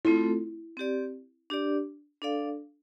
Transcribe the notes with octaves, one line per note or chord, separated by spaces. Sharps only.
A3 C4 E4 F4 A4
C4 G4 D5
D4 G4 D5
D4 A4 D5 F5